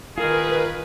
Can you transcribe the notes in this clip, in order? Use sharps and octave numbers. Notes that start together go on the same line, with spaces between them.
D#3 F4 G#4 A#4 B4